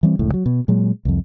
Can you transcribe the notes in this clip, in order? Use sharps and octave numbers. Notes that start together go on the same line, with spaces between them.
E3 G3 C4
F1 C#2 A2
F#3
B2
A#2 F#3 G#3
C2 F2